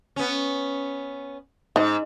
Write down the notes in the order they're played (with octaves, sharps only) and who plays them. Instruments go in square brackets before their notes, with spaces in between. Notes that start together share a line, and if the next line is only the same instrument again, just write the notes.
[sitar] B3 C#4
[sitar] G#2 [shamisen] D#4 D#5